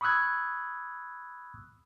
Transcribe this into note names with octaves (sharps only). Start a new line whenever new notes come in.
B5 C#6 D#6 E6 F#6 G#6